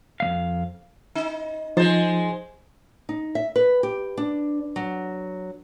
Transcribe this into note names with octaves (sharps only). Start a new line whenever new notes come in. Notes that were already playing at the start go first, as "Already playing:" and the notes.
F2 G#3 F5
D#4
F3 G#3 D#4 C5 A6
D#4
E5
B4
G4
D4
F#3